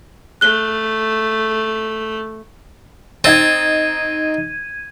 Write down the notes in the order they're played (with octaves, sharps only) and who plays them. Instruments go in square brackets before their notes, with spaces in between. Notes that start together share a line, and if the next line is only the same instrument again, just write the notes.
[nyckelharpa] A3 [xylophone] F#6 G7
[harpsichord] C4 [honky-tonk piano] D#4 A6 [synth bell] G#6 D#7